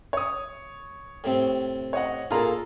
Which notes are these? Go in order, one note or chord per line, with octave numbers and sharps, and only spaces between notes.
C#5 D#6
A2 C3 C4
C#5 D#5 F#5
A#2 F4 G#4 A4 A#5